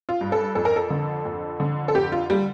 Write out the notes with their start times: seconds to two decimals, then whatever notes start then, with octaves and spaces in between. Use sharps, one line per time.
0.09 F4
0.21 G2
0.32 A4
0.55 F2 A4
0.65 A#4
0.76 A4
0.90 D3
1.25 F2
1.60 D3
1.88 A4
1.95 F2 G4
2.12 F4
2.30 G3